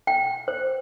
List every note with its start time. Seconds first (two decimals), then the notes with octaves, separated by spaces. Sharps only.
0.07 G5
0.48 C5